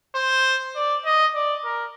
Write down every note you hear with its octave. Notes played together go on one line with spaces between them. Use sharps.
C5
D5
D#5
D5
A#4